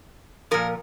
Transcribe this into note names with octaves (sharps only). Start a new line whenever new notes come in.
A#2 F3 A#4